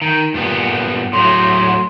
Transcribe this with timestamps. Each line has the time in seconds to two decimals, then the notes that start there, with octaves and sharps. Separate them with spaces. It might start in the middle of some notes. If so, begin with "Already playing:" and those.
0.02 D#3
0.34 G2 A#2 B3
1.13 A2 F#3 C6